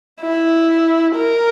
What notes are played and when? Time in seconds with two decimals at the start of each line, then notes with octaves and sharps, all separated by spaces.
0.22 E4
1.17 A#4